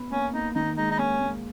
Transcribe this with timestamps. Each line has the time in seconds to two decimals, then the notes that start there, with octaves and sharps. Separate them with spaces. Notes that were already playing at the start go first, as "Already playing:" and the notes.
Already playing: B3
0.12 A#3 C#4
0.34 A#3 D#4
0.55 D#3 D#4
0.77 G#3 D#4
0.91 D#4
0.99 A#3 C#4
1.21 A#3